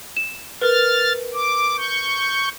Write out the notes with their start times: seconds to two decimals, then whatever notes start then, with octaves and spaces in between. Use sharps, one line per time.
0.17 E7
0.61 A#4 B4 F6 A6
1.34 D6
1.77 C#6 G6